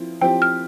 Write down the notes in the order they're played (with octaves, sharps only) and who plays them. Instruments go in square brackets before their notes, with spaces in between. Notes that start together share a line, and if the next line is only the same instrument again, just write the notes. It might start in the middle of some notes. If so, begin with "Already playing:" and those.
Already playing: [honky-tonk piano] F3 C4 E4
[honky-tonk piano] F3 C4 E4 G4 [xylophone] G5
[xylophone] F6